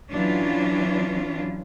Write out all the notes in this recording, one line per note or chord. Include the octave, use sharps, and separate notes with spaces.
E3 F#3 C#4 D4 F4